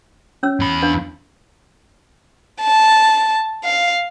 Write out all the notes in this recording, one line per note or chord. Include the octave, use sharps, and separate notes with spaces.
C#4 C#5 E6
E2 B5
D4 B4 F5
A5
F5